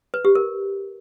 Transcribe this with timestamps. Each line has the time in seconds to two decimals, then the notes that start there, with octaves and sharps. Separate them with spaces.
0.14 B4
0.25 G4
0.35 A#4